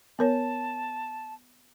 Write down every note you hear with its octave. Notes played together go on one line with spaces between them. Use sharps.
B3 A#4 C#5 A5